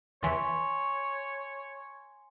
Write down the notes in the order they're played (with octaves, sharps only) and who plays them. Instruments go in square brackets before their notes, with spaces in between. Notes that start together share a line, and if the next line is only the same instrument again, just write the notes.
[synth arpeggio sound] E2 E3 [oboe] C#5 [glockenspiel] G#5 C6 A6